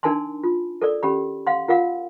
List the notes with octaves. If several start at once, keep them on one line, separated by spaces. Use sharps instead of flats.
D4 D#4 A#4 G#5 A5 C6
F4
A4 A#4 D5
C#4 G4 B5
F5 F#5 C6
F4 A#4 F5 F#5